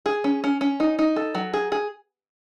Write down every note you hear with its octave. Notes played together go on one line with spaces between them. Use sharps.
G#4
C#4
C#4
C#4
D#4
D#4
A4
F#3
G#4
G#4